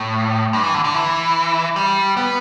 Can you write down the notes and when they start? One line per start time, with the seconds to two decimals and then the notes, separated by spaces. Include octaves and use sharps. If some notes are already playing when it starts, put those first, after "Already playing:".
Already playing: A2
0.53 G2
0.64 E3
0.74 D3
0.85 D3
0.94 E3
1.76 G3
2.17 B3